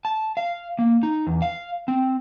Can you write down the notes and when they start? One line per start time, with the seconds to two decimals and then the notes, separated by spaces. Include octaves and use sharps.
0.05 A5
0.37 F5
0.79 A#3
1.03 D#4
1.27 E2
1.42 F5
1.88 C4